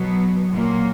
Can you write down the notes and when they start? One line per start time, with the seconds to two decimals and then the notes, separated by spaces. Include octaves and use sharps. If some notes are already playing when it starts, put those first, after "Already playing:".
Already playing: B2 F#3 B3
0.51 A#2 F#3 A#3